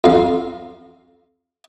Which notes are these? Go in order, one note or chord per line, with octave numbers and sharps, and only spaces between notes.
F2 F5